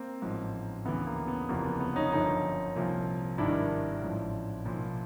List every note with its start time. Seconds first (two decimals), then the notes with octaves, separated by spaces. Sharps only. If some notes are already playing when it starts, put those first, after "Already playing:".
Already playing: A#3 C4
0.22 A1 G#2 F3
0.85 D2 C#3 E3 B3
1.07 A#3
1.28 B3
1.49 F#1 E2 C3 F3 A#3
1.65 B3
1.80 B3
1.96 C#4 D#4
2.12 G1 F#2 D3 F3 C#4 D#4
2.76 C2 A#2 F3
3.38 G#1 G2 D#3 D4 E4
4.02 A1 G#2 F3
4.65 B1 A#2 F3